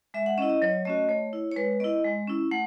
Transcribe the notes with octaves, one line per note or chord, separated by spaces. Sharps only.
G#3 E5
F#5
C#4 E4 D#5
D#5
F#3 C#5
A3 C#4 F#4 D#5
A3 C#5
E4
C#5
G#3 B4
B3 E4 D#5
G#3
C#4 E4
A3 F#5